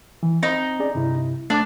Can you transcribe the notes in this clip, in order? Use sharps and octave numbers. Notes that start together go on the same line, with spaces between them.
E3
C4 D#4
C#4 G#4 D5
G2 C3 E4
A3 D4 D6